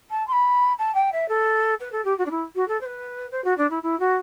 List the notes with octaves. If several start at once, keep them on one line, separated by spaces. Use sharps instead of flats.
A5
C6
B5
A5
G5
E5
A4
B4
A4
G4
F#4
D4
E4
F#4
A4
C5
B4
C5
F#4
D4
E4
E4
F#4